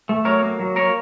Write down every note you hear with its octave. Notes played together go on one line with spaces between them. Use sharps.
A3
F#3 A#4 C#5
A#3
F#3
A#3 A#4 C#5